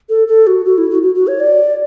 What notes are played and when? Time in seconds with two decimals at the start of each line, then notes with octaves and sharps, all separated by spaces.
0.09 A4
0.28 A4
0.47 F#4
0.65 F#4
0.78 E4
0.91 F#4
1.03 F#4
1.15 F#4
1.27 C#5
1.40 D5